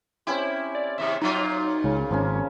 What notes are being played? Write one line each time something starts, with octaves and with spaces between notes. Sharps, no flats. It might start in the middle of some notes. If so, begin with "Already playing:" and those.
C4 C#4 E4 G4
D5
D#2 C3 E5
A#2 F#3 D#4 F4
C#2 C#3
G#1 F3 A#3 C#4